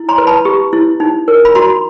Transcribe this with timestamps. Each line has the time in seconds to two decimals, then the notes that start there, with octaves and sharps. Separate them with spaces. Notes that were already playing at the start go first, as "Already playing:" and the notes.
Already playing: E4
0.09 A#5 C6
0.18 B4
0.27 A5 B5
0.45 G4
0.73 E4
1.00 D#4
1.28 A#4
1.45 B5
1.55 F#4 A#5 C6